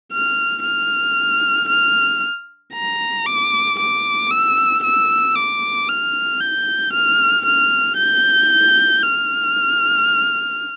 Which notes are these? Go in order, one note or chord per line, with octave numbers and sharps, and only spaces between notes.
F6
F6
F6
A#5
D6
D6
E6
E6
D6
F6
G6
F6
F6
G6
F6